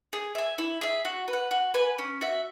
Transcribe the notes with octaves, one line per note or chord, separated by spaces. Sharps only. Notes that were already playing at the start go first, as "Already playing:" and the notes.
G#4
E5 G#5
E4
G#4 E5
F#4
B4
F#5
F#4
B4 G#5
C#4
F#4 E5